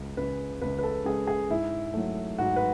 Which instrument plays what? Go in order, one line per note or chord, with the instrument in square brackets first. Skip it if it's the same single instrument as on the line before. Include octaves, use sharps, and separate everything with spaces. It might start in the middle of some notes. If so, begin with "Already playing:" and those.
Already playing: [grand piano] C#2
C#3 G#3 B4
C#2 B4
B4
A4
C#3 G#3 G#4
G#4
G#2 E4
F#3 A3
G#2 F#4
B4